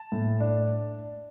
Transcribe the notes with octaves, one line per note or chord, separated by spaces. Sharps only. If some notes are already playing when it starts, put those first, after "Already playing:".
Already playing: A5
A2
D4